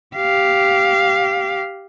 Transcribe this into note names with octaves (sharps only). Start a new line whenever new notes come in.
G4 F5